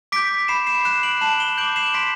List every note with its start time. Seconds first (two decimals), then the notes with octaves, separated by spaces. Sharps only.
0.12 D6 G6 B6 D7
0.48 B5 C7 E7
0.67 C7 E7
0.85 F#6 C7 E7
1.03 D7 F#7
1.21 A5 C7 E7
1.40 E7 G7
1.58 D6 G6 D7 F#7
1.76 C7 E7
1.95 C6 B6 D7